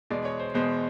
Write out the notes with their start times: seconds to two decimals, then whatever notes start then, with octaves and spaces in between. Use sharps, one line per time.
0.10 E2 B2 G#3 D5
0.25 C#5
0.40 C5
0.54 E2 B2 G#3 C5